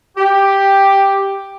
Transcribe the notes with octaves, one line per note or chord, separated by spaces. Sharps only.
G4